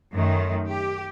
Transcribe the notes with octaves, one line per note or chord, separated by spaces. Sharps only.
F#2 D#3 A3
G4